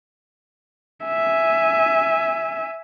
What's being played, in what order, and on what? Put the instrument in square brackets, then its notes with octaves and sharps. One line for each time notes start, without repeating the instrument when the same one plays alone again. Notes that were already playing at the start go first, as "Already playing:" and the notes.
[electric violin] E5 G#5